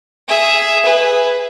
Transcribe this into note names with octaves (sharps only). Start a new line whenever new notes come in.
G#4 E5
G#4 B4